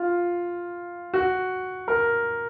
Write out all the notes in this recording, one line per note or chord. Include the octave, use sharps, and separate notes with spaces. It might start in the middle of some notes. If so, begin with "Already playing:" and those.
Already playing: F4
F#4
A#4